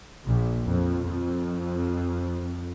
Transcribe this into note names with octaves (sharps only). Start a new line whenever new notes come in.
A#1
F2
F2